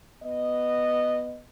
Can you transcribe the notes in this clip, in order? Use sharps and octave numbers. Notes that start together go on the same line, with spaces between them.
B3 D#5